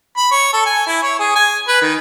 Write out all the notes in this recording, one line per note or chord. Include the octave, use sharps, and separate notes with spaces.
B5
C#5
A4
G#5
E4
C#5
G#4
G#5
B4
D#3